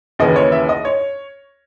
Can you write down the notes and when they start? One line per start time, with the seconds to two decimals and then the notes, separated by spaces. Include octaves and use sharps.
0.19 D#2 C#3 E3 D#5
0.36 C#5
0.52 E5
0.69 D#5
0.85 C#5